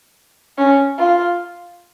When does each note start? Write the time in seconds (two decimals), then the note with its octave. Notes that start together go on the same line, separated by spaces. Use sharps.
0.58 C#4
0.99 F4